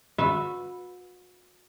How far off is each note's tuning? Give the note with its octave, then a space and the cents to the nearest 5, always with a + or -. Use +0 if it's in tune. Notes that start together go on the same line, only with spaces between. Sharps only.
F#4 -40 B4 +0 E5 +0